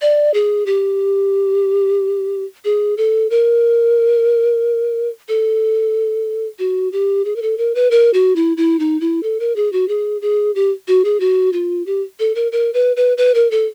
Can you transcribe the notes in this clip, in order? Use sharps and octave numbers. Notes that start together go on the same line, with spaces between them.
D5
G#4
G4
G#4
A4
A#4
A4
F#4
G4
G#4
A#4
A4
A#4
B4
A#4
F#4
E4
E4
D#4
E4
A4
A#4
G#4
F#4
G#4
G#4
G4
F#4
G#4
F#4
F4
G4
A4
A#4
A#4
B4
B4
B4
A#4
A4